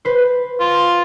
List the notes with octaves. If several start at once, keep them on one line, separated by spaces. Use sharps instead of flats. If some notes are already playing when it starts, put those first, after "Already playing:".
B4 C5
F4